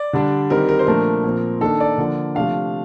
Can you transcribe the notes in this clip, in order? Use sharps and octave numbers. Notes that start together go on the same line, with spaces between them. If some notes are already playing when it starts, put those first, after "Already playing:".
Already playing: D5
D3 G3 D4
D#3 G3 C4 A#4
A#4
C5
A#2 F3 A3 D4 A#4
A#2 F3 C4
D#3 A#3 D4 A4
D5
D3 F3 A#3 D4
C3 F3 A3 D4 F5